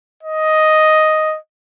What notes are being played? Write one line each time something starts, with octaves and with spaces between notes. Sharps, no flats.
D#5